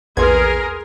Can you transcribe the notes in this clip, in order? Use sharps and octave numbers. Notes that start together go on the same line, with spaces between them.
A#1 E2 G#4 A#4 B4 C6 G#6